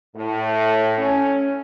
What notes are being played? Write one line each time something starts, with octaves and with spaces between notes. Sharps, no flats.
A2
C#4